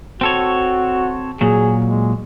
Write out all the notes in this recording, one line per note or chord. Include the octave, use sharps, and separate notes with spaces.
C4 F#4 A4 C#5
A#2 F#3 G#4
G#3